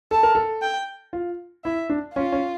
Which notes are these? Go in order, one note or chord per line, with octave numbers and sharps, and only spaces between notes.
A4 A5
A#4
A4
G5
F4
E4 E5
D4
C#4 F4
C#4